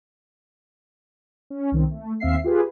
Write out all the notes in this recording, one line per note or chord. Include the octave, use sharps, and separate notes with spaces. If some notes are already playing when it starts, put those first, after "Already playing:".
C#4
C2 D#3 C4
A3
D#2 C4 E5 F5 C7
F4 G4 G#4 B4